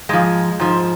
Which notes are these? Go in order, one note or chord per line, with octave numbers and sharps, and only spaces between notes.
G#2 F3 G#3
G#2 F3